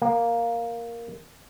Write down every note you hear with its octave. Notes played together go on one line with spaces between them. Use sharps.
A#3